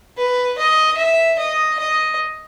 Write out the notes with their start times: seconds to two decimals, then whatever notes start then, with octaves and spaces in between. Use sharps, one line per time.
0.17 B4
0.58 D#5
0.97 E5
1.39 D#5
1.79 D#5